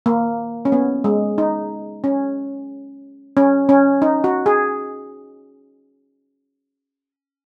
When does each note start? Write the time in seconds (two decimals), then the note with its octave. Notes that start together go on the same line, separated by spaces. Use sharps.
0.06 A#3
0.65 C#4
0.72 B3
1.04 G#3
1.38 D#4
2.04 C#4
3.37 C#4
3.69 C#4
4.02 D#4
4.24 F#4
4.46 G#4